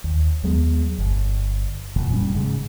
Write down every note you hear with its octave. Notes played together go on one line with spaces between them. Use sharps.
D#2
D#2 F#3 G#3 B3
G1
F1 A#2 E3 A#3
F1 G3 C#4
G#2 C#3 G#3